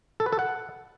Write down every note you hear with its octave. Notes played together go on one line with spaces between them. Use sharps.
A4
B4
A4
F#5